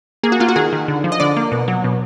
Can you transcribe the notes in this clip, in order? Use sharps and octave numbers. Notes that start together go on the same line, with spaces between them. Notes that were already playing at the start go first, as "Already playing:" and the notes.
A#3 G#4
F#4
A#3 F4
F#4
D#3 G#4
D#3
D3
F3
D#5
D3 D5
A#3
B2
F#3
B2